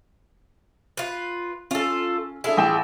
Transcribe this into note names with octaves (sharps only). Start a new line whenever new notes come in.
F4 B4
C#4 F4 A4
D4 E4 F4 G#4 A4 E5
A1 G5 E7